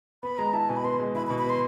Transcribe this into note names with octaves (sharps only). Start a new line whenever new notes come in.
B3 B5
G#3 A#5
E4 A5
B2 G#5
B5
B3 C6
G#3
E4 B5
B5
B2
B5
B3 C6